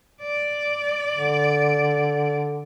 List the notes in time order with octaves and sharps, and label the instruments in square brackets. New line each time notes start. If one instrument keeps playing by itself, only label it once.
[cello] D5
[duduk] D3